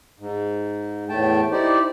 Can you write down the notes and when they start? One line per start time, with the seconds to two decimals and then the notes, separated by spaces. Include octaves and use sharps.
0.19 G#2
1.09 E2 A2 A3 G5 A5
1.52 D#4 E4 G4 C5 D5